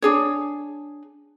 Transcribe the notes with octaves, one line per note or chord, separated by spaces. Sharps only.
D4 G#4 C#5